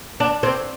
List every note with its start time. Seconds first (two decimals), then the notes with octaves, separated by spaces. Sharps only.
0.20 D4
0.43 C4